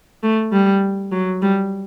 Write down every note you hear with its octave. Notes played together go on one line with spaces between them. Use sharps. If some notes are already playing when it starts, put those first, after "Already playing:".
A3
G3
F#3
G3